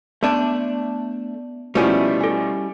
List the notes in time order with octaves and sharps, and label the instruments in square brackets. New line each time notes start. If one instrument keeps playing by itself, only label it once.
[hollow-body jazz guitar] A3 D4 [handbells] B3 D5
[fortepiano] B2 F3 A3 [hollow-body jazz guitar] G3 C#4 E4
[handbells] A4 G#5